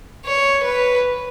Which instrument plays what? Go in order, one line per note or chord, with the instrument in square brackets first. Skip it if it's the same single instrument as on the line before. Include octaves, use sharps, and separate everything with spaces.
[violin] C#5
B4